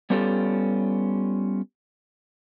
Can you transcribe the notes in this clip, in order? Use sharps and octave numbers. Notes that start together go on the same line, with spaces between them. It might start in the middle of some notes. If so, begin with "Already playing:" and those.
G3 B3 C#4 F4 G4 A4